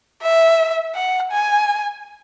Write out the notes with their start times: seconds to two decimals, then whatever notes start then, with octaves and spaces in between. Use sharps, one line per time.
0.23 E5
0.95 F#5
1.31 G#5